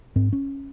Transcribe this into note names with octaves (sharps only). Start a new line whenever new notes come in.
G#2 C4
C#4